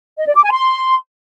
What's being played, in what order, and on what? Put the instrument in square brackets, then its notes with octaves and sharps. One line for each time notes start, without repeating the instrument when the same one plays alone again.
[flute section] D#5
D5
D6
G#5
C6